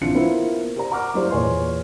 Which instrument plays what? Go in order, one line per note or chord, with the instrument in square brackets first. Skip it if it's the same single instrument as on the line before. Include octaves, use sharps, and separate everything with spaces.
[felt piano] A#1 E3 C4 F4 C#7
A#3 B3 E4 F4 A#4 C5
G4 A#4 C5 D5 A#5
F#5 A#5 C#6 D6 F6
F#3 A#3 E4 G4 C5 D5
E2 A#2 C#5 G#5 C6